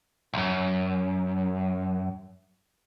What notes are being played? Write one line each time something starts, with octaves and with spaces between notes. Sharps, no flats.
B1 F#2